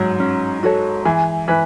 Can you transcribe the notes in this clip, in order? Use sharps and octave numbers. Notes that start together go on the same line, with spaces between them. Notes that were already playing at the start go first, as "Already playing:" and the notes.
Already playing: G#2 F#3
C#4
F#4 A4 C#5
E3 G#4
E3 B4